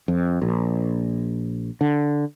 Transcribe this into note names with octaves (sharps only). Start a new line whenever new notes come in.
F2
A#1
D3